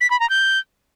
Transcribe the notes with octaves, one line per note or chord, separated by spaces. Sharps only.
B6
B5
A#5
G6